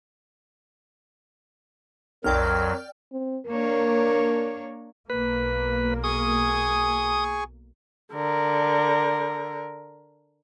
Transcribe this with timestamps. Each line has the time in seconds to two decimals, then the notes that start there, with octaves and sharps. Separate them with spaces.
2.24 B1 F2 F#3 A#4 D5 G5 F6
3.12 C4
3.46 A#3 D4 A#4 C#5
5.10 B1 A#3 B4
6.04 G#4 G#5 C#6 D#6
8.13 D3 A#4